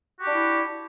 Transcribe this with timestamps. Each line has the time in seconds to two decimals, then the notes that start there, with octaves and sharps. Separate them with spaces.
0.19 F#4
0.23 G4
0.27 D4
0.30 E4